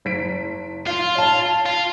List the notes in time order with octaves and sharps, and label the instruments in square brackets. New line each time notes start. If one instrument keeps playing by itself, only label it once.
[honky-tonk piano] F#1 B6 D7
[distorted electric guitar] F4 [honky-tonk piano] F5
[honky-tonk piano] C#5 F5 A5
[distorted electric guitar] F4